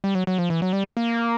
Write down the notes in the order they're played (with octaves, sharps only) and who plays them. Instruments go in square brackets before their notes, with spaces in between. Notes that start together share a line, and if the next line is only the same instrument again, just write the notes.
[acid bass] G3
F#3
F#3
F3
E3
F#3
G3
A#3